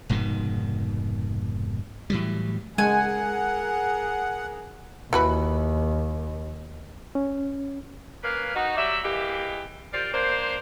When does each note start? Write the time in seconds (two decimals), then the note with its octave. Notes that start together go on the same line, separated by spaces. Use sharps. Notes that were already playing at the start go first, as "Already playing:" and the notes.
0.09 F1 G#2 B2 D#3
2.10 A2 E3 F#3 G3
2.78 G#3 G#4 A#4 F#5 G#5
5.13 D#2 E3 F#4 B4
7.15 C#4
8.23 A#3 C#4 B4 F5
8.55 D#4 F#4
8.76 F#3 G3 D5 E5
9.03 E3 G#3 A#3 G4
9.92 F4 G4 A#4 C5 D5
10.13 A#3 D4 C5